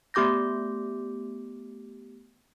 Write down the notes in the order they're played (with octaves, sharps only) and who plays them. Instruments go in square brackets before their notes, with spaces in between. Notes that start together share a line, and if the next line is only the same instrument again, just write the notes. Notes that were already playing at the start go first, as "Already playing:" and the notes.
[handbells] A3 B3 G4 D6 G6 A#6